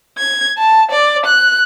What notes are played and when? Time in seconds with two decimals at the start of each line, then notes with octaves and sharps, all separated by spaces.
0.18 G#6
0.58 A5
0.92 D5
1.26 F#6